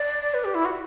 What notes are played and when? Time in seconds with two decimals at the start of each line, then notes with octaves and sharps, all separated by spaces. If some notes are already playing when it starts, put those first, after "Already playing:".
Already playing: D5
0.34 B4
0.44 G4
0.55 E4
0.65 F#4